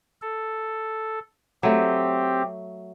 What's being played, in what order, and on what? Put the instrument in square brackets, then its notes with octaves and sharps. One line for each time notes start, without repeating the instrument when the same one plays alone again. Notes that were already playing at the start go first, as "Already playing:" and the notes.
[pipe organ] A4
[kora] F#3 A3 [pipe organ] C4 G4